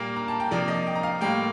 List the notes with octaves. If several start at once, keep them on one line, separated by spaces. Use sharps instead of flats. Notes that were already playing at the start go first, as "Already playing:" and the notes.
Already playing: A#2 G3 A#3
A#5
A5
G5
C3 F3 A#3 D5
D#5
G5
A#5
F5
A2 G3 A#3 G5